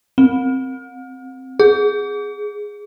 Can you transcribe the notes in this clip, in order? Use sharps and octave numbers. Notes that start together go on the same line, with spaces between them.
C4
G#4